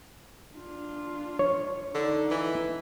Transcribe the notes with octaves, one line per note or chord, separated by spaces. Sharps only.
D4 F4
C#5
D3 D#4
E3